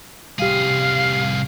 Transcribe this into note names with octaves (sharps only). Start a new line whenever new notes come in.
C2 G3 G4 G#4 F5